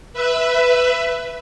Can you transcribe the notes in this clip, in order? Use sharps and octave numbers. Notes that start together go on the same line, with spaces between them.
B4 E5